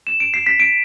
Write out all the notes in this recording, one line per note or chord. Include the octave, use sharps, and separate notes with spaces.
E7
D7
C7
B6
D7